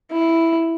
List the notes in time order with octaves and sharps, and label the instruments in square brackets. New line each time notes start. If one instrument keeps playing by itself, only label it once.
[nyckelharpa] E4